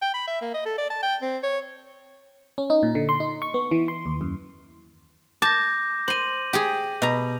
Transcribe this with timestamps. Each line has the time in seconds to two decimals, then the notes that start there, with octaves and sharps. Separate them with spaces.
0.02 G5
0.14 B5
0.27 E5
0.42 A#3
0.54 D#5
0.66 A4
0.78 D5
0.90 A5
1.03 G5
1.22 C4
1.43 C#5
2.58 C#4
2.70 D#4
2.83 A#2
2.95 D3
3.09 C6
3.20 D#4
3.42 C#6
3.54 B3
3.71 E3
3.88 C6
4.06 D#2
4.21 F#2
5.42 A5 D6 G6 A#6
6.08 C5 C6 D#7 F#7
6.53 G4 G#4
7.02 B2 A#5